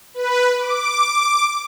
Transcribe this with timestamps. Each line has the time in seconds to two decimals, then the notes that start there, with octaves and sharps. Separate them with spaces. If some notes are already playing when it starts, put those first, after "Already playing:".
0.14 B4
0.58 D6